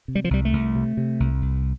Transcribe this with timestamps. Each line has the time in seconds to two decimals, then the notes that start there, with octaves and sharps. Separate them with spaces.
0.08 C3
0.15 G3
0.24 F3
0.30 C2 G3
0.45 A3
0.53 C2
0.75 C3
0.97 C3
1.20 C2
1.42 C2